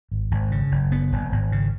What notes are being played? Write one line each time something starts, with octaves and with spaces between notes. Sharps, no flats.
G#1
G#1
C#3
F#1
F#1 B3
F#1
G#1
C#3